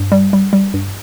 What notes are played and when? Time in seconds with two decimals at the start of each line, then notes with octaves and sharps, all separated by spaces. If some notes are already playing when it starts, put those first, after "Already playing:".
Already playing: G2
0.12 G3
0.33 G3
0.53 G3
0.74 G2